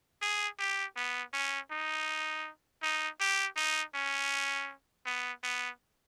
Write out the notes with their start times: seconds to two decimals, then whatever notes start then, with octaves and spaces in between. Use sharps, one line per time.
0.22 G#4
0.59 G4
0.96 B3
1.33 C#4
1.71 D#4
2.83 D#4
3.20 G4
3.57 D#4
3.95 C#4
5.06 B3
5.43 B3